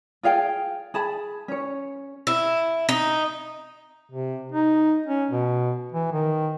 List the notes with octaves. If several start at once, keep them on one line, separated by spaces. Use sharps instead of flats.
F4 G#4 F5 G5
G#4 A5 B5
C#4 C#5
E4
D#4
C3
D#4
C#4
B2
E3
D#3